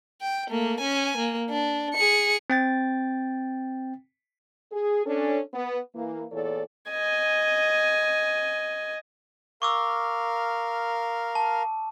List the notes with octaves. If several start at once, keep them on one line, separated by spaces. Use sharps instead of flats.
G5
A3 A#3
C#4 G#5
A#3
D4
G#4 C#7
C4 G5 A6
G#4
C#4 D4 A4
B3
E3 A#3
E2 A#2 E3 A4 C#5 D5
D#5 G#5
A#4 F5 C#6 D6 E6
A5